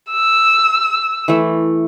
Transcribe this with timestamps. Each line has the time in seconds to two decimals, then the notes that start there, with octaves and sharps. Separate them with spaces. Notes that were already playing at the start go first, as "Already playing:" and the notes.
0.11 E6
1.28 E3 A3